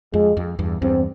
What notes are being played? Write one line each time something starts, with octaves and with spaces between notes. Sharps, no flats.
F2 G#3
F2
E2 G2
E2 G2 C4